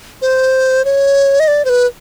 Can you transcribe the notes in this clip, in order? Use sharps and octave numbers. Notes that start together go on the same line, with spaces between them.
C5
C#5
D#5
D5
C5
B4